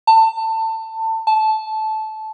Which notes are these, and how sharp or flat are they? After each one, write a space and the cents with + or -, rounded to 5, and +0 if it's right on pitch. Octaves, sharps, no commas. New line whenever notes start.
A5 +25
A5 -15